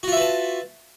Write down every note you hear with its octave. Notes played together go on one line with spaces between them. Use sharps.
F4 F#4 B4 E5 A5